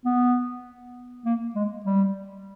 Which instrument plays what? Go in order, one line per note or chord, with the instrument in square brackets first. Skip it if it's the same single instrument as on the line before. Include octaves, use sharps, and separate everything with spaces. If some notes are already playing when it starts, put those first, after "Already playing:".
[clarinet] B3
A#3
G#3
G3